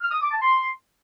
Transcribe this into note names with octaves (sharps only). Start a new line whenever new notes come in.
F6
D#6
D6
A5
C6